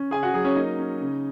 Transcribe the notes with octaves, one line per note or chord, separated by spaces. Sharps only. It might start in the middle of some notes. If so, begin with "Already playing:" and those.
Already playing: C#4
C#3 G#4 G#5
F#4 F#5
F#3 G#4
C#4 C#5
A#3 D#4 D#5
C#4
C#3